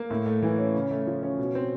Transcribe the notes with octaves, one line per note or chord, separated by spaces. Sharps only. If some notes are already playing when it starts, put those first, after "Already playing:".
Already playing: A#3
A2
A3
E3
C#4
C#3
A3
F3
C#4
B2
C4